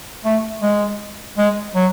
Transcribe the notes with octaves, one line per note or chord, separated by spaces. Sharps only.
A3
G#3
G#3
F#3